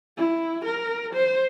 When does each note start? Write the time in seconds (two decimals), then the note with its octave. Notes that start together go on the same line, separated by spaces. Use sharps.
0.17 E4
0.65 A#4
1.13 C5